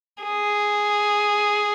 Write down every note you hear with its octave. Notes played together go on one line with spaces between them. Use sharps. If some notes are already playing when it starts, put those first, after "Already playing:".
G#4